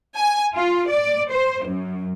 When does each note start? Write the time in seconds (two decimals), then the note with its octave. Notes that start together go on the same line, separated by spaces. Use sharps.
0.17 G#5
0.55 F4
0.88 D5
1.31 C5
1.66 F#2